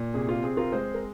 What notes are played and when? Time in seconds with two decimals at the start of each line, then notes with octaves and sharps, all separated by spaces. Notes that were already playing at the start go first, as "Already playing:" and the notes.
Already playing: A#2
0.14 C3 G#4
0.29 F4
0.43 C4 G#4
0.57 F4 A#4
0.71 G#3 G#4 C5
0.94 A#4